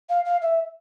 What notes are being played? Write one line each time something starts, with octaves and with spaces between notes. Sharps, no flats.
F5
F5
E5